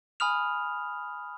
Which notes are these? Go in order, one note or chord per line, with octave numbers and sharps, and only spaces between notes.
G#5 B5 D#6 F6 F7